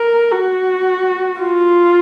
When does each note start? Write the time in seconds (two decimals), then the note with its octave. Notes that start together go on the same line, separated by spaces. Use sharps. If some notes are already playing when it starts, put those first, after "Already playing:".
Already playing: A#4
0.31 F#4
1.41 F4